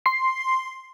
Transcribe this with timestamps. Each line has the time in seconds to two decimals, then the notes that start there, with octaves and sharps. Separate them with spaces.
0.06 C6 C7